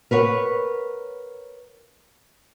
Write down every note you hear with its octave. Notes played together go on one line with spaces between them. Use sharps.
A#4 B4 C#5 F#5